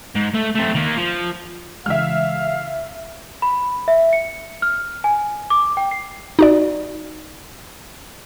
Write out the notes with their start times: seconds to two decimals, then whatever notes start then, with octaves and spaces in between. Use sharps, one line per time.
0.16 G#2
0.35 A3
0.55 A3 C4
0.75 D#3 A#3
0.97 F3
1.86 C#3 E3 G#3 E5 F5 F6
3.42 B5
3.88 E5
4.13 C#7
4.62 F6
5.04 G#5
5.50 D6
5.77 G5
5.91 C7
6.39 D#4 F#4 D5